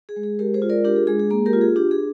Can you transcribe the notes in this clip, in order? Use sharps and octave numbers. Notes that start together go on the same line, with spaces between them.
G#4
G#3
G#4
G#3 G4 A#4
G#4 C5
F4
A#4 D5
D4 G4 A#4
G#4
G#3 G#4
G#4
A#3 G#4
G4 A#4
F4
G#4
D4 G4
G#4